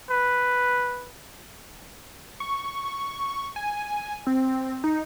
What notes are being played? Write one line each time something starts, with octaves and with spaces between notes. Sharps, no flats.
B4
C#6
G#5
C4
D#4